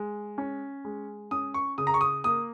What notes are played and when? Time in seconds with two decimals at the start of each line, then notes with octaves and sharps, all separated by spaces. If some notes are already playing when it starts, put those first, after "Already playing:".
Already playing: G#3
0.38 C#4
0.85 G#3
1.31 C#4 D#6
1.54 C#6
1.78 C#3 D#6
1.87 A#5
1.94 C#6
2.01 D#6
2.24 A#3 D#6